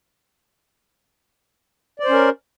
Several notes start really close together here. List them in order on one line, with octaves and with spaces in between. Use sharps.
D5 C5 C#4 A#4